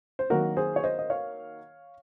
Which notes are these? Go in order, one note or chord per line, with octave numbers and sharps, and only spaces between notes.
C5
D#3 F#3 A#3 F#4 A#4
G#4 C5
C#5
C5 D#5
D#5
C#5 F5